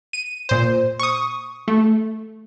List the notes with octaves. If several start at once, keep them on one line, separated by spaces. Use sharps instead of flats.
D#7
A#2 C5
C#6 D#6
A3